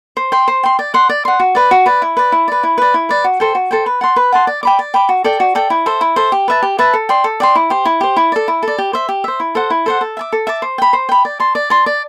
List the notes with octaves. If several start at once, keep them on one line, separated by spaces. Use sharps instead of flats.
C5
G5 C6
C5
G5 C6
D5
F#5 C6
D5
F#5 C6
F#4
B4 D5
F#4
B4 D5
E4
B4 D5
E4
B4 D5
E4
B4 D5
E4
B4 D5
F#4
A4 C5 G5
F#4
A4 C5 G5
B4
F#5 A5 C6
B4
F#5 A5 C6
D5
G5 B5 D6
D5
G5 B5 D6
F#4
A4 D5 G5
F#4
A4 D5 G5
E4
A4 C5 E5
E4
A4 C5 E5
G4
B4 E5 A5
G4
B4 E5 A5
A4
D5 G5 C6
A4
D5 G5 C6
E4
G4 C5
E4
G4 C5
E4
A4 D5
E4
A4 D5
G4
C5 E5
G4
C5 E5
E4
A4 C5 F#5
E4
A4 C5 F#5
A4
E5 A5 D6
A4
E5 A5 D6
C5
G5 B5
C5
G5 B5
D5
A5 C6
D5
A5 C6
D5